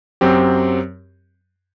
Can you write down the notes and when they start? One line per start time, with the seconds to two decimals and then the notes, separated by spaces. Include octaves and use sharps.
0.21 F#2 F#3 C4 G4